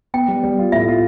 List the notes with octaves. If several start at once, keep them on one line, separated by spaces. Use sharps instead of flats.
B3 G5
G3
G3
F4
A2 E5
F4